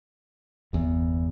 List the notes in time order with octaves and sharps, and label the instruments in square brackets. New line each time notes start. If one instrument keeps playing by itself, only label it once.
[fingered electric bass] G1 E2